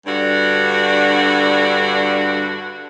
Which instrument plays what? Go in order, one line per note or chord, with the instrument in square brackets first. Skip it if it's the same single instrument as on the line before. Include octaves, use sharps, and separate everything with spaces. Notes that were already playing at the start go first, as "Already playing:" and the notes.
[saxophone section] G2 D3 D4 F#4